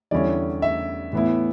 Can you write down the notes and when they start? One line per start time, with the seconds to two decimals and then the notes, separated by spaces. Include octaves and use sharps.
0.11 E2 D3 G3 C#4 E4 D5
0.62 E5
1.13 A2 E3 B3 E4